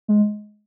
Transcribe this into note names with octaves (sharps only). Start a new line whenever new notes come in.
G#3